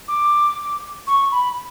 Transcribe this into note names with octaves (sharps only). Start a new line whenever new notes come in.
D6
C#6
B5